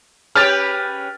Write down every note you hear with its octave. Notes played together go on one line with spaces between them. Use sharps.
C#4 G4 B4 F6 A6